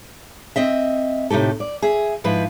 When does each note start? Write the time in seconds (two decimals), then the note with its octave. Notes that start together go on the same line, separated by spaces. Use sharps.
0.56 C4 D#5 E5
1.30 A2 C3 D#4 G4 A4
1.60 D5
1.82 G#4 E5
2.24 G#2 F3 E4 B4